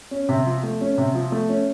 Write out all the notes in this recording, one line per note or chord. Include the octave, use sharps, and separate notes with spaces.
C#4
C3
F3
A3
C#4
C3
F3
A3
C#4